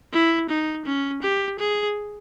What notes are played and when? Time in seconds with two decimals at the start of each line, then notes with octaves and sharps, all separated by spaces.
0.13 E4
0.49 D#4
0.85 C#4
1.22 G4
1.59 G#4